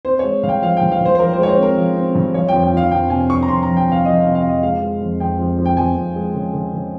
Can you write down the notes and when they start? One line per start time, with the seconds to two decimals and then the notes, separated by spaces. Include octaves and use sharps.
0.05 C4 C5
0.19 G#3 C#5
0.43 G2 F5
0.49 G5
0.62 F3 F5
0.77 G2 G5
0.92 F5
1.01 G2 C5
1.15 C5
1.19 F3 A#4
1.33 C5
1.39 G#3 C#5
1.49 C5
1.57 C4
1.63 A#4
1.77 F3
1.96 C4
2.15 G2
2.34 F3 C#5
2.49 F2 G5
2.63 G5
2.73 F3 F5
2.91 F2 G5
3.10 C3 G#5
3.29 F2 C#6
3.43 A#5
3.48 F2 C6
3.63 F3 A#5
3.77 G5
3.87 C3 F5
4.05 F3 D#5
4.20 C3 F5
4.35 F5
4.44 F2
4.49 D#5
4.63 G#3 F5
4.82 G#3
5.01 F2
5.20 F2 G5
5.39 F2
5.58 F2
5.66 G5
5.77 F2 G#5
5.96 F2
6.16 G#3
6.34 C#3
6.53 C#3
6.73 C#3